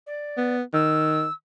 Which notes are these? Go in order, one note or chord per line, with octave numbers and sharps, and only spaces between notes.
D5
B3
D#3 E6